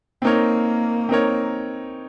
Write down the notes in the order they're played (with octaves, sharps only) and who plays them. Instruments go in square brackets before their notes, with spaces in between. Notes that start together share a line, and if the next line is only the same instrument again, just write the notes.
[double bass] A#3 [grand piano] C4 D#4 A#4 C#5
[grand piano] C4 D#4 A#4 C#5